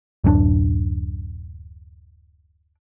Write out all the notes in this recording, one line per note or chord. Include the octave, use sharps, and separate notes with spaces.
D1 F#2 C4 D4